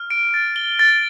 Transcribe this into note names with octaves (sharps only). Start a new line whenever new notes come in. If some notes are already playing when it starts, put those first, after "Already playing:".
Already playing: F6
D7
A6
G7
A6